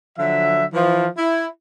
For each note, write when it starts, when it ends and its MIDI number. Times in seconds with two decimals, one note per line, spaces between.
0.18 0.65 50
0.18 0.65 53
0.18 0.65 54
0.18 0.65 76
0.74 1.08 52
0.74 1.08 53
1.17 1.47 64